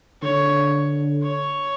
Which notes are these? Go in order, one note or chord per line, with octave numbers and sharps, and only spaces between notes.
D3 C#5
C#5